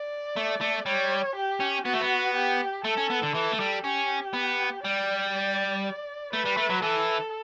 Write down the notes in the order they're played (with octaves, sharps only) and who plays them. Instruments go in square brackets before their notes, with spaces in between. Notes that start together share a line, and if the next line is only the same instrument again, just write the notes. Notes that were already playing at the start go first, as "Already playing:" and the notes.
Already playing: [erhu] D5
[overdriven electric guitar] A3
A3
[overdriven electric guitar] G3 [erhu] C#5
[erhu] G4
[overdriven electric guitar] C#4
[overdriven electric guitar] B3 [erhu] F#4
[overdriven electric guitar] A3
B3
[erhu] G4
[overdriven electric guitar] A3 [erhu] A4
[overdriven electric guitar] C#4
B3
D3
[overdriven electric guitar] E3 [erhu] A4
[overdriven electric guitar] A3
G3
[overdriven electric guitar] C#4 [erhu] G4
[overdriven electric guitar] B3
[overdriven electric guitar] G3 [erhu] D5
[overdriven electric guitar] A3 [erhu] B4
[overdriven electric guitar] G3
A3
F#3
[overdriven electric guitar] E3 [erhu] A4